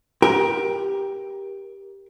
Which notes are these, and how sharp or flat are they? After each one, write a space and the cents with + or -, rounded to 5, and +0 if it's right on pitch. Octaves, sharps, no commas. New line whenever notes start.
G4 +5 A#4 +20